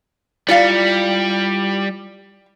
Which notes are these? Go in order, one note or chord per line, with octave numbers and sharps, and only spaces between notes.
G3 E4 F4 D5 F5 C#7